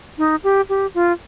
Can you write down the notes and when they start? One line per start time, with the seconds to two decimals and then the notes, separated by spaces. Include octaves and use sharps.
0.18 D#4
0.44 G4
0.69 G4
0.95 F4